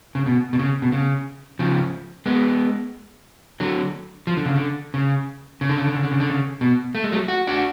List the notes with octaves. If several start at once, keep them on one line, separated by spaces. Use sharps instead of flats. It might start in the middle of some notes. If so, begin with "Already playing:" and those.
C#3
B2
B2
C#3
B2
C#3
C#3 F3
G#3 B3
D3 F#3
F3
D3
C#3
D3
C#3
C#3
D3
C#3
D3
C#3
D3
C#3
D3
C#3
B2
A3
G#3
F#3 A3
F#4
D4 F#4